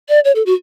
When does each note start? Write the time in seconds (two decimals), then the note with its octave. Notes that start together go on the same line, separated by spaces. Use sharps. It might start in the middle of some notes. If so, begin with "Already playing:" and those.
0.09 D5
0.25 C#5
0.35 A4
0.46 F#4